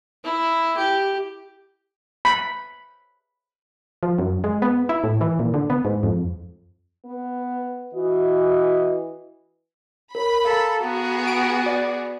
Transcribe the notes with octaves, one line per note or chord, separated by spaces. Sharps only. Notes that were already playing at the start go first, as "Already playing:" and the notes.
E4
G4
B5
F3
F#2
G#3
B3
E4
A2
E3
A#2
D3
B3
G#2
F2
B3
E3 F#4 D#5
A#4 C#5 B5
A4 F5 A#5
B3 F#4 G#4
D7
D5